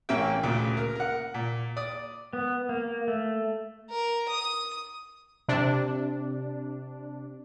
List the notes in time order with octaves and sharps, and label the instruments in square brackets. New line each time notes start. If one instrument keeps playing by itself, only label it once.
[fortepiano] A1 A#3 C#4 E5 G5
D2 A#2 C#3
A#4
A#4 F#5
A#2
D5 D#6
[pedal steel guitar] B3
A#3
A3
[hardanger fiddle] A#4
D#6
[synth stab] C3 D4